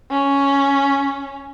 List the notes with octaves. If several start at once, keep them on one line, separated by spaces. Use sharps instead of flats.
C#4